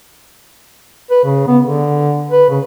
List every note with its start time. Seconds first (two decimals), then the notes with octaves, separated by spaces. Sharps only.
1.11 B4
1.24 C#3
1.47 B3
1.63 D3
2.31 B4
2.50 C#3